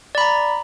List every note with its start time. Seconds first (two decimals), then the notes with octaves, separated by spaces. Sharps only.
0.15 D5
0.18 B5
0.21 A#5